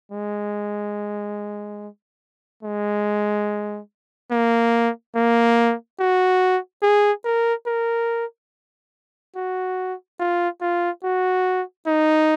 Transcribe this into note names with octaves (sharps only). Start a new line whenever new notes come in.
G#3
G#3
A#3
A#3
F#4
G#4
A#4
A#4
F#4
F4
F4
F#4
D#4